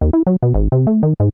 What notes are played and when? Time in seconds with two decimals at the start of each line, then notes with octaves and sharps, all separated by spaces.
0.01 D#2
0.13 E4
0.27 F#3
0.43 B2
0.54 G#1
0.72 C3
0.87 A3
1.03 D#3
1.20 G#2